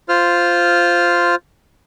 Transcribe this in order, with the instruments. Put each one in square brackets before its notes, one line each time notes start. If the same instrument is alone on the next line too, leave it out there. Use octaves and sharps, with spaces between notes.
[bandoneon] F4 C5 F6